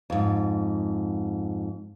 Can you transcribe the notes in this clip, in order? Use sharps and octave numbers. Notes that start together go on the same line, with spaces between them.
F2 G#2